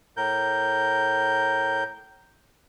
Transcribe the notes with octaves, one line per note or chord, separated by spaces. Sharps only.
A2 A#4 G6